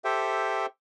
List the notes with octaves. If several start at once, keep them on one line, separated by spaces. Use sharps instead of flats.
G4 A4 C5 E5 G5